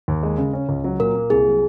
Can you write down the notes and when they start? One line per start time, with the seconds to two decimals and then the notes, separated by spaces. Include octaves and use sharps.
0.08 D#2
0.23 G#3
0.38 C#3
0.53 C#4
0.69 C#2
0.84 F#3
0.99 A#2 A#4
1.15 A#3
1.30 C2 G#4
1.45 F#3